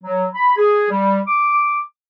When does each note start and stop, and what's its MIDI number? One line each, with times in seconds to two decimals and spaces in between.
0.04 0.26 54
0.35 0.53 83
0.57 0.90 68
0.91 1.19 55
1.27 1.80 86